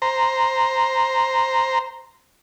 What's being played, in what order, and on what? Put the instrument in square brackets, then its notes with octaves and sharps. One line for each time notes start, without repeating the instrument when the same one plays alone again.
[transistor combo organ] C5 A#5